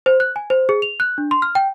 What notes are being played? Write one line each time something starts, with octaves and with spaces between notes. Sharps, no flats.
C5
F#6
G#5
C5
G#4
F7
F#6
D4
C6
F6
G5